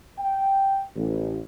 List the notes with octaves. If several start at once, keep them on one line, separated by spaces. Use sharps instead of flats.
G5
A1